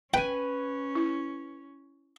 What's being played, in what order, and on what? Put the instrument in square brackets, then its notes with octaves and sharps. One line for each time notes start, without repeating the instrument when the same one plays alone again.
[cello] C#4 [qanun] B4 G#5 [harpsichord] G5
[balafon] E4